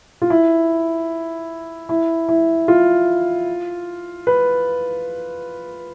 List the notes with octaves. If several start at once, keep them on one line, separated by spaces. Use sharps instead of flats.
F4
E4
E4
E4
F4
B4